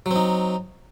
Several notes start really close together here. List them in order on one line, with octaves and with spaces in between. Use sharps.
F#3 C4 D#4